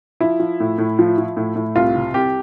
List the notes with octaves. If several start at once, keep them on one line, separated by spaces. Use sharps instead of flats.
F3 E4
F3
A2
A2
F3
F3
A2
A2
C2 F4
C3
C2 G4